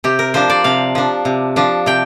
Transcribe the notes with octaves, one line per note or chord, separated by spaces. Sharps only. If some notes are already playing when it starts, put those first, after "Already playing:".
C3 G4
A#4
F3 D4 C5
D5
C3 F5
F3 D4
C3
F3 D4
C3 G5